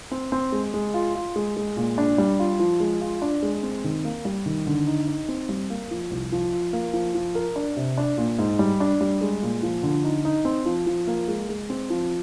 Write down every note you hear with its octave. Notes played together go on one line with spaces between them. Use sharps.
C4
C4
G#3
G#3
F4
F4
G#3
G#3
A#2
D4
G3
F4
F3
G#3
F4
D4
G#3
C4
D#3
A#3
G3
D#3
D3
D#4
D#4
C4
G3
A#3
F3
C2
F3
F4
A#3
F3
F3
A#4
D4
C3
D4
A#2
G#2
G3
D4
G3
G#3
A#2
F3
D3
D#4
D#4
C4
F3
F3
A#3
G#3
G#3
C4
F3